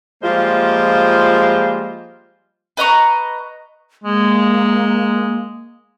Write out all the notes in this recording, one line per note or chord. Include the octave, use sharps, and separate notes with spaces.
F3 G3 G#3 A#3 F4 C5
B4 D#5 A#5 C#6
G#3 A#3